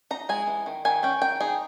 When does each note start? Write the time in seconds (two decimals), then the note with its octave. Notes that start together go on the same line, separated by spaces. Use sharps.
0.11 D#4 A#5
0.29 G#3 G#5
0.47 E3
0.66 D#3
0.85 D#3 G#5
1.03 C#4 G5
1.22 D#3 G5
1.40 D#4 G#4